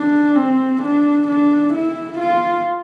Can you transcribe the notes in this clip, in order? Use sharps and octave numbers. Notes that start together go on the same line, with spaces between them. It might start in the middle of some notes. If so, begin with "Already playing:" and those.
Already playing: D4
C4
D4
D4
E4
F4